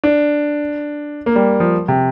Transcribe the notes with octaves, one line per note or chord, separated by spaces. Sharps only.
D4
A#3
G3
F3
C3